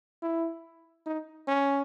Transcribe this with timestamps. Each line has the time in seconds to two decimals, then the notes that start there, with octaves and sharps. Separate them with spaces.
0.23 E4
1.06 D#4
1.48 C#4